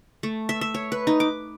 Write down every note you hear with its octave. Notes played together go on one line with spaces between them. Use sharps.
A3
E5
E5
C#5
B4
D#4
D6